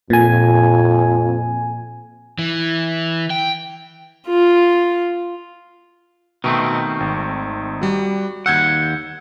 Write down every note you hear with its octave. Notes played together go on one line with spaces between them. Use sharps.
F2 A#2 G#5
E3
G5
F4
B2 D#3 A3 C4
G#1
G3 F#4
D#2 F#5 E6 G6 G#6